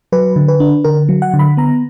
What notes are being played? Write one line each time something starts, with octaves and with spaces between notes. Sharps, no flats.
F#3 B4
D3
B4
D4
D3 A#4
F#3
F#5
D3
B5
B3 A#5